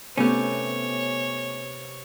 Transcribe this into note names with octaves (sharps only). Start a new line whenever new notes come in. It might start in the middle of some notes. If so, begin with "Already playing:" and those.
C3 A3 B3 C#4 G4 C#5